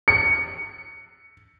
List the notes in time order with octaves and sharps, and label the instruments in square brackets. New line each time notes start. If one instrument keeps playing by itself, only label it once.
[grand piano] C#7